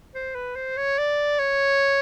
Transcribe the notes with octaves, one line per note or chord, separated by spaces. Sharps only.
C5
B4
C5
C#5
D5
C#5